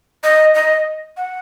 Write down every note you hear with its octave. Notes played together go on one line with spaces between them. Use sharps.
D#5
D#5
F#5